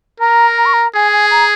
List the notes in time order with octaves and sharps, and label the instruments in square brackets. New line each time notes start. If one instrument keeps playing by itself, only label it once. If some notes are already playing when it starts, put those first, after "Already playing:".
[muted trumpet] A#4 [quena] A#5
[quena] A#5
C#6
A#5
[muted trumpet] G#4 [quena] G#5
[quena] G#5
A#5